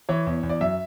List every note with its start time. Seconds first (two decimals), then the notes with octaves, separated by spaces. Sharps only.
0.09 E3 C#5
0.27 E2
0.43 E2
0.49 D5
0.61 F#2 E5